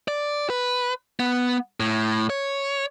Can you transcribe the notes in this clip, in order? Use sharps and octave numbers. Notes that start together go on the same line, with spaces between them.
D5
B4
B3
A2
C#5